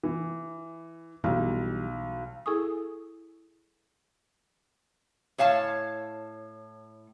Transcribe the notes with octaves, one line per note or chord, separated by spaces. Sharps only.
E3
B1 E3 G3
E4 G#4 A4 G#5 C#6 D#6
A2 C#5 F5 A5